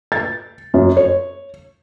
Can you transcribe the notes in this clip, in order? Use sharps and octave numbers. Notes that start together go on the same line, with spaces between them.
A6
F#2
C#5